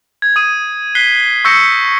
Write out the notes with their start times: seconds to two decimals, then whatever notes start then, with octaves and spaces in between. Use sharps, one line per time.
0.22 G#6
0.36 D#6 D#7
0.95 F#6 B6 C7 G7
1.45 C#6 E6 G6 A#6 C#7